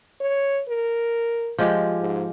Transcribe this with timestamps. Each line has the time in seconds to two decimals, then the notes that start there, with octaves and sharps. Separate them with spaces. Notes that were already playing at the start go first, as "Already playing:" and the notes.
0.20 C#5
0.68 A#4
1.59 F3 G#3 G4
2.00 G#2